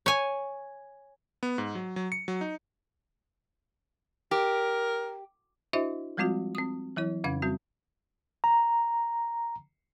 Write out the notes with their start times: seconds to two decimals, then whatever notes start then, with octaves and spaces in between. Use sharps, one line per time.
0.06 C#5 G#5
1.43 B3
1.58 G#2
1.75 F#3
1.96 F#3
2.12 C#7
2.28 F#3
2.41 D#4
4.31 G4 A#4
5.73 D4 E4 F#4 C5 D#5 E5
6.17 F3 G3 G#3 C4 F4 F#4
6.55 C4 D#6
6.96 E3 F#3 E4 C#5
7.24 F2 C#3 C#4 F5 G#6
7.42 G3 C4 F#4
8.44 A#5